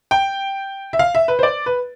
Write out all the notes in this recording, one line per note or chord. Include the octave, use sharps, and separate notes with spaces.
G5
E5
F5
E5
B4
C5
D5
B4